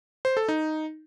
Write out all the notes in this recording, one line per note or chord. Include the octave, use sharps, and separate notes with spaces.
C5
A4
D#4